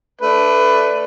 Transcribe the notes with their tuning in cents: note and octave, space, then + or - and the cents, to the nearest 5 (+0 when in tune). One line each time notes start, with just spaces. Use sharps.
A3 +0 D4 +0 B4 +15